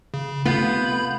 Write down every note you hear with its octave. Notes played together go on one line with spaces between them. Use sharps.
C#3
C3 A3 B3 F4 B5 G6